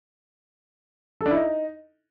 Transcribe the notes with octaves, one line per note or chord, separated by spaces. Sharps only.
A4
D4
E4
D#4